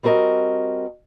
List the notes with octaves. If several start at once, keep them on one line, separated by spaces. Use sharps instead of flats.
G3 C4 F#4 A#4 D#5 A5